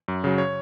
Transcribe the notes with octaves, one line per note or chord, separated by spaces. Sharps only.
F#2
C#3 F#3
C#5